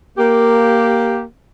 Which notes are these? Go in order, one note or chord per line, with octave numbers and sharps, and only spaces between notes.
A#3 G4